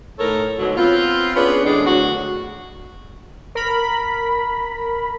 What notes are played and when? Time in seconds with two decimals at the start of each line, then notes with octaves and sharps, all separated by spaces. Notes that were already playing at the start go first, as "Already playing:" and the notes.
0.18 A2 D#3 A4 A#4 C#5
0.58 G#2 B2 D3 F#3
0.77 B3 C4 F4
1.35 B3 C#4 D4 G#4 B4
1.65 E2 A2 G#3 D4
1.86 D2 F#3 F#4
3.55 A#4 B5